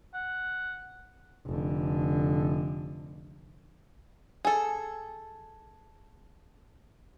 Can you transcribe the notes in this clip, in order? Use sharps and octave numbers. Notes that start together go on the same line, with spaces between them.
F#5
F1 D3
G#4 A4